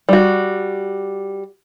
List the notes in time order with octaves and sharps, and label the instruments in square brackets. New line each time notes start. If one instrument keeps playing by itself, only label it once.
[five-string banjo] G3 F#4